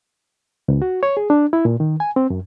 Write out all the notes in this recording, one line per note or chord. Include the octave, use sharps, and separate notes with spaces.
C#2
F#4
C#5
G#4
D4
E4
A#2
D#3
G#5
C4
F#2